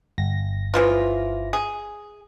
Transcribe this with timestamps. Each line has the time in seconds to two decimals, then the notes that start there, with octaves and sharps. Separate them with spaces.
0.18 G1 A#6
0.74 E3 F3 F4
1.53 G#4